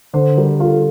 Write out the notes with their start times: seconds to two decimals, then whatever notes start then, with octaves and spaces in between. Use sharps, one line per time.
0.13 D3 C5
0.37 G3 A#4
0.60 F4 A4